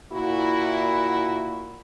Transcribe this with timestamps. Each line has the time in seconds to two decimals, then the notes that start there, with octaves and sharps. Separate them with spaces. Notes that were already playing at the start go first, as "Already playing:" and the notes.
0.13 A#2 E4 F#4